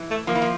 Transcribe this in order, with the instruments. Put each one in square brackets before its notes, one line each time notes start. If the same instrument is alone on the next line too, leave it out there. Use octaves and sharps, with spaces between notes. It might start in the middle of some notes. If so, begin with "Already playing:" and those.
Already playing: [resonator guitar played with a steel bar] E3
[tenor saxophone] A3
[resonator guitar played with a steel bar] F3 [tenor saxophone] A#3
[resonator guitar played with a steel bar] E3
F3